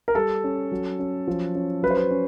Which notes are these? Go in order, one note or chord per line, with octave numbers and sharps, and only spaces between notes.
A#4
G3 A4
C#4
F#3
C#4
F3
C#4
F#3 B4
C5
B4
C#4